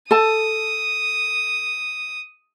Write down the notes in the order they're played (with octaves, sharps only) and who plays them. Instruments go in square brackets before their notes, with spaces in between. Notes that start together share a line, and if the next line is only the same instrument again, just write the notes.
[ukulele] A4 A5 [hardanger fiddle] D#6